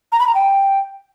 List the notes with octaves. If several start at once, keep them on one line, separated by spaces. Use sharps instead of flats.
A#5
B5
A#5
G5